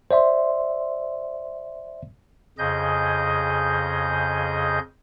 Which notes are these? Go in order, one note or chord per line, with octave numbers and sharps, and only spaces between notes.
C5 D5 E5 C6
F2 C#3 G#4 D#5 G6